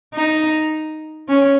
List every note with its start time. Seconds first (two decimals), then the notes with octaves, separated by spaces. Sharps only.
0.14 D#4
1.28 C#4